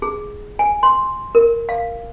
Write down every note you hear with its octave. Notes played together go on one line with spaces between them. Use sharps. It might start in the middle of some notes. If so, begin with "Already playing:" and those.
G#4
G#5
C6
A#4
F5